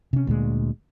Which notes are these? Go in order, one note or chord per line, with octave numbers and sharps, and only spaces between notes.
C3 C#4
D2 A#2 G#3